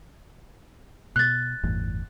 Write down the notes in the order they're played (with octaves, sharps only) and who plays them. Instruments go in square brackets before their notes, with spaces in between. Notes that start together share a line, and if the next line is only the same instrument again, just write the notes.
[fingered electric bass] B2 [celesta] F#6 A6
[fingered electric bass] G1 E2 A2